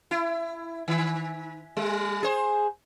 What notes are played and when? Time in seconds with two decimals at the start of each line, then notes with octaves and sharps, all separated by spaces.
0.11 E4
0.88 D#3
1.77 G3
2.23 G#4 C5